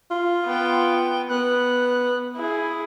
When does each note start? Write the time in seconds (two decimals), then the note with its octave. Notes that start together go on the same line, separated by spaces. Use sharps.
0.11 F4
0.45 B3 G5
1.31 B3 F#6
2.36 E4 G#4